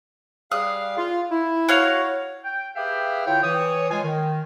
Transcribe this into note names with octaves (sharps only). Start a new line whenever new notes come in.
G3 G#4 F5 D#6 F#6
F4
E4
F#4 C#5 F5
G5
G4 G#4 B4 E5 F5 G5
D3 E4 F4 C#5 G5
E3 C#5 D#6
G#3 F4 G#5
D#3